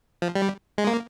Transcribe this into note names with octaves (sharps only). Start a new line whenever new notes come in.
F3
G3
G#3
A#3